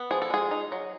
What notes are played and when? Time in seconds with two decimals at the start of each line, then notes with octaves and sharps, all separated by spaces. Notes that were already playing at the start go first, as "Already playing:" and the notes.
Already playing: B3
0.11 F3 G#4
0.22 A4
0.30 G#3 G#4
0.51 D#4
0.72 F#3